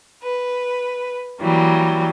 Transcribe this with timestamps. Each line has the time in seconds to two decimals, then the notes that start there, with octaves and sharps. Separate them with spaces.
0.23 B4
1.41 E3 F#3 G3 A#3